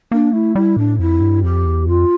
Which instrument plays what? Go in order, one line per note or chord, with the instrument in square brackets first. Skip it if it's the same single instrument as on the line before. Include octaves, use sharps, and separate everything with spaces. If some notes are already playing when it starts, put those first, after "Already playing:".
[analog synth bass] A#3 [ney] D4
[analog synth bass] A3 [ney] E4
[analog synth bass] G3 [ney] E4
[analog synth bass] A2 [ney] D4
[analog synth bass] F2 [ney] E4
[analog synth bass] G2
[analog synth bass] F2 [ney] G4
[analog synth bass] E2
[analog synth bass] F2 [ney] F4